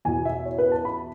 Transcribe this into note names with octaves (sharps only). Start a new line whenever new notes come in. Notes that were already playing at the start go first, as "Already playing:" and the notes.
E2 B2 G#5
E5
C#5
B4
A5
B5